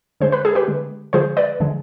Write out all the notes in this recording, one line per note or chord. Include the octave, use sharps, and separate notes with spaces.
D3 G#3 C5
B4
G#4
G4 B4
D3 G#3
D3 F3 G#3 G#4 C5
B4 D5
D3 F3 G#3